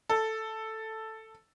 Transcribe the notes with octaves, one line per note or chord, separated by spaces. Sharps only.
A4